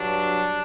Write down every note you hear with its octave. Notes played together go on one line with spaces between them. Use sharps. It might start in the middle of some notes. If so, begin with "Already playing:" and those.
Already playing: G2 F#3 D4